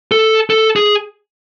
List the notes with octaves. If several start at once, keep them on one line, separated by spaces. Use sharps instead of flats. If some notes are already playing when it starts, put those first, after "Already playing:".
A4
A4
G#4